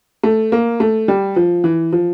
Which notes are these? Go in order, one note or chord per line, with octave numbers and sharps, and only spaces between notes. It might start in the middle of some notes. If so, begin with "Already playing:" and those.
A3
A#3
A3
G3
F3
E3
F3